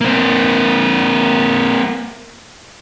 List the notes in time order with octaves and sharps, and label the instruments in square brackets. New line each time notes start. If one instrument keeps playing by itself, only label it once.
[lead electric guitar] A#3 C4